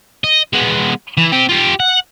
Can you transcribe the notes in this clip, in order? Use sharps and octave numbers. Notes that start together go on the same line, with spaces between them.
D#5
G#3 B3
E3
C4 G4
F4 G4
F#5